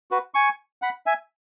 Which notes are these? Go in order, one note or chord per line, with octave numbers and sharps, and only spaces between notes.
F#4 B4
G#5 C#6
F#5 B5
E5 G#5